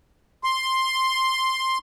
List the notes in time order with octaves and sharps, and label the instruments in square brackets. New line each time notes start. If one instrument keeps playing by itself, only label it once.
[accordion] C6